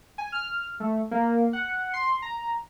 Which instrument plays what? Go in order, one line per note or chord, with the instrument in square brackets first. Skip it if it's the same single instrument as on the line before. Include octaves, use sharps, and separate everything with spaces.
[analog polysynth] G#5
F6
A3
A#3
F#5
C6
A#5